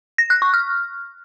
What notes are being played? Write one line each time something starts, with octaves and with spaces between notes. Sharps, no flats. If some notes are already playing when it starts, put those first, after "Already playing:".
A#6
F#6
C#6
F6